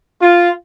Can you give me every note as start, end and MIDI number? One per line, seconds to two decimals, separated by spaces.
0.22 0.50 65